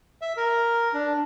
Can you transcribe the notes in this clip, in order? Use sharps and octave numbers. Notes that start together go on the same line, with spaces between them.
E5
A#4
D4